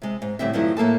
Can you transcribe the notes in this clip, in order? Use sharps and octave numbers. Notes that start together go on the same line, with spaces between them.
C3 G#3
G#2
A2 D3 G3 C4 E5
G2 D#3 F3 F#3 A3 E4
A2 A#3 A4 A5